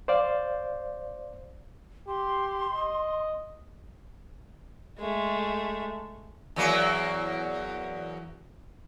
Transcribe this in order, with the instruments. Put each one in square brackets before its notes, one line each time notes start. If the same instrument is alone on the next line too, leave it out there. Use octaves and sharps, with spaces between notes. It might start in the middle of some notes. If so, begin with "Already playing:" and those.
[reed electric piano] C5 D5 F5
[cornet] G4 [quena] C6
[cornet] D#5
[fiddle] G#3 A3
[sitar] E2 F#3 A#3